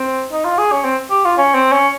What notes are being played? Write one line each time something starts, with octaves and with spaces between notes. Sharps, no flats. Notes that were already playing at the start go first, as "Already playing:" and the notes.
Already playing: C4
D#4
F4
G#4
C#4
C4
G4
F4
C#4
C4
C#4